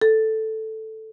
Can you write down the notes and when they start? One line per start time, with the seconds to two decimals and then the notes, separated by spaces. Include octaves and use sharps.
0.02 A4